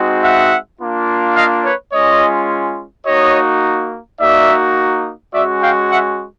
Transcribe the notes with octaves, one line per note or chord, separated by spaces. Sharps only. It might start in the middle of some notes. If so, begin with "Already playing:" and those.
Already playing: G#3 C4 D#4 F#4
E5 F#5
A#3 D4 F4
D#5 F5
B4 C#5
G#3 C#4 F4 C#5 D#5
A#3 D#4 F#4 C#5 D#5
A#3 D#4 F#4 D5 E5
G#3 C#4 F#4 D5 E5
F5 G5
E5 F#5